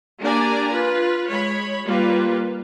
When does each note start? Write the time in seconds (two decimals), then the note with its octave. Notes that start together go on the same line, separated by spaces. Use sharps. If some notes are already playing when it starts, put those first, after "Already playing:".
0.21 A#3 D4 G4 D5 G#5 A#5
0.71 F4 B4
1.27 G#3 C#5 B5
1.84 G3 A#3 F4 B4